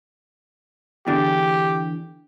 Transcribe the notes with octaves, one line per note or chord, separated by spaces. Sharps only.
E2 D3 D4 G4